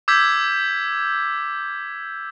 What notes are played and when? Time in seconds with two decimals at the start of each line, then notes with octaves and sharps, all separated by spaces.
0.08 D6 E6 G6 G#6 B6